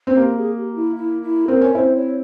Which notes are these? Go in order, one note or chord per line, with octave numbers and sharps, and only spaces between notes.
C4
A#3 G4
G#4
G4
E4
E4
E4
C4 A#4
C#4
C4 E4 C5
C#5